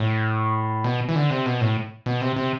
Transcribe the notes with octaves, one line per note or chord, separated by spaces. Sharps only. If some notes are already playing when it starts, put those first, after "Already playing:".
Already playing: A2
B2
E3
D3
C3
B2
A2
B2
C3
C3